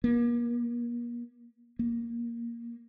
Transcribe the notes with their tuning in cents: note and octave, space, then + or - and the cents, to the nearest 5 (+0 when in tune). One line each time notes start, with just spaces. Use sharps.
A#3 +40
A#3 +5